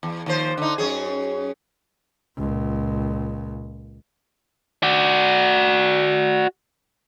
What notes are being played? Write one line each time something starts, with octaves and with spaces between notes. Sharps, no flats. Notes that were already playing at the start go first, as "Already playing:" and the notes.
E2
D#2 F3 C5
D3 D#4
F#2 C#4 G#4
C#2 A#2
F#4 D5